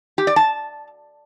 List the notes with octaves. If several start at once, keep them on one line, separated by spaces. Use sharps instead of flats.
G4
D5
A5